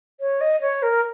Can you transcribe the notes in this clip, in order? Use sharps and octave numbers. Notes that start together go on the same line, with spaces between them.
C#5
D#5
C#5
A#4